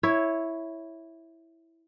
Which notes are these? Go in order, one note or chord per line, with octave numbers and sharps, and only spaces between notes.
E4 C#5